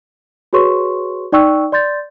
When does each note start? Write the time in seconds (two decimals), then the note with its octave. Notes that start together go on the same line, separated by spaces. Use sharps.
0.53 F#4 G#4 B4 C#5 C6 C#6
1.32 D#4 D5 G5 C#6 E6 F#6
1.72 D5 C6 G6 A6